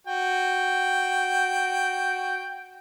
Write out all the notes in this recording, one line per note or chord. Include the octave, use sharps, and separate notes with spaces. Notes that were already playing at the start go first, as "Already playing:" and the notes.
F#4 G5